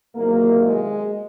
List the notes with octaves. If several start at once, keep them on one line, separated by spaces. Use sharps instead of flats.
E2 C3 D#3 F#3 A#3
G#3